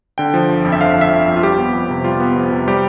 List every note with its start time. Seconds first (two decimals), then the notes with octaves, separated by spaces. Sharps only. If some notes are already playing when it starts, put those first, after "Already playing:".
0.18 D3 G5
0.34 F3
0.49 G1
0.65 F2
0.72 E5
0.81 D3 F5
0.96 F3
1.01 E5
1.11 G1
1.28 F2
1.36 F4
1.43 G3 G4
1.58 B3
1.74 F2
1.90 C3
2.04 G3 F4
2.20 B3
2.36 F2
2.52 C3
2.68 G3 G4